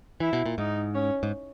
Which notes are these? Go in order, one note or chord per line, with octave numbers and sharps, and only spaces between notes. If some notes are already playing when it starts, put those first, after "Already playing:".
E3 E4
B2
A#2
G#2 D#4
C#4
G#2